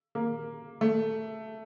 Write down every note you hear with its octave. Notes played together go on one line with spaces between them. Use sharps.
A#3
A3